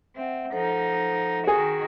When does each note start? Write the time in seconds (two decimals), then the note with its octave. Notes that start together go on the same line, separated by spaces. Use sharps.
0.16 C4 E5 F#5
0.52 F3 D#4 A4 C5 F#5
1.47 D#3 F#4 G#4